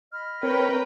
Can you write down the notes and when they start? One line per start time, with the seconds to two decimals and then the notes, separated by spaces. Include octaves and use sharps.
0.12 D#5 B5 F6
0.43 C4 A#4 B4 C#5 G5 A#5